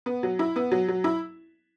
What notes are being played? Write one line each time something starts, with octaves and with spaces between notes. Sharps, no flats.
B3
F#3
E4
B3
F#3
F#3
E4